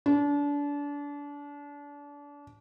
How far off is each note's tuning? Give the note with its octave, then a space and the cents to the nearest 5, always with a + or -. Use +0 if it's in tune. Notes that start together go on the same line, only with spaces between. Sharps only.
D4 -30